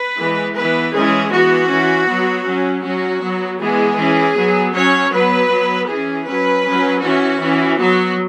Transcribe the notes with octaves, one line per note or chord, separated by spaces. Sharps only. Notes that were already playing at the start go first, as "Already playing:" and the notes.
Already playing: B4
E3 G#3 B3
E3 B3 B4
E3 G#3 C#4 G#4
E3 B3 F#4
E3 C#4
F#3 B3
F#3 C#4
F#3 C#4 F#4
F#3 B3
E3 G#3 B3 G#4
E3 C#4
F#3 B3
F#3 C#4 C#5
F#3 B3 B4
F#3 B3
E3 C#4 G#4
F#3 C#4 B4
F#3 C#4
E3 C#4 F#4
E3 C#4
F#3 B3 F#4